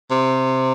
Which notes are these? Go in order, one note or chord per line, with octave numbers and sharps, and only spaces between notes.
C3